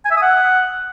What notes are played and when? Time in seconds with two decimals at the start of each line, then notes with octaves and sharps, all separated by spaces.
0.05 G#5
0.11 E5
0.16 D#6
0.22 F#5